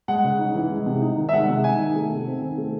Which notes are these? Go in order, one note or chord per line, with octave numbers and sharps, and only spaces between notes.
G#3 F#5
C#3
D#4
E3
G#3
C3
D#4
D#3
E5
G#3 F#5
C3
D#4 G#5
D#3
A3
C3
C4
D#3
A3